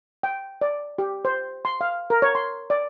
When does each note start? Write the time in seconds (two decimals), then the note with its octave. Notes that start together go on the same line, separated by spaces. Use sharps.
0.23 G5
0.61 D5
0.98 G4
1.25 C5
1.65 C6
1.81 F5
2.10 A#4
2.22 C#5
2.35 C6
2.70 D5